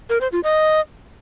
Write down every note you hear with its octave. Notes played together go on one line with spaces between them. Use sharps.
A#4
C5
F4
D#5